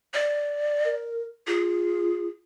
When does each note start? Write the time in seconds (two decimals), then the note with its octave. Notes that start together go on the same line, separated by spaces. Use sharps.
0.14 D5
0.85 A#4
1.47 F4 G#4